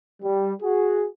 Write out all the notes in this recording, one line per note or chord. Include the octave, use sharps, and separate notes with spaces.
G3
F#4 G#4